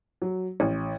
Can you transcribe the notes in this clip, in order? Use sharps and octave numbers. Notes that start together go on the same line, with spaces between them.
F#3
A1